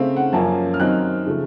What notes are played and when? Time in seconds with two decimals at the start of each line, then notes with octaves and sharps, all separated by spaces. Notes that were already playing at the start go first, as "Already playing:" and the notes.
Already playing: C#3 A3 C4 F5
0.17 F#5
0.33 F#2 F3 A#3 C#4 A5
0.74 F6
0.80 D#3 F#3 C4 D#4 F#6
1.26 C#3 F3 A3